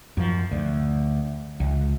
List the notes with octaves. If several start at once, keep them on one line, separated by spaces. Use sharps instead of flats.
F#2 F3
D2
C#2